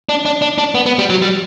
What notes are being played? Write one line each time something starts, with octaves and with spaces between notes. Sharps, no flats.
D4
D4
D4
D4
B3
B3
G3
F#3
G3